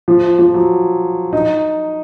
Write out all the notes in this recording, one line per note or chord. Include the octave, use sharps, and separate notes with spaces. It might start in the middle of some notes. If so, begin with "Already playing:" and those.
F3
F3
F#3
D#4